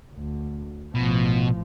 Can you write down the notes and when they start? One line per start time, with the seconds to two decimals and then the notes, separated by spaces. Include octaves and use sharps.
0.14 D2
0.95 A1 B2 F3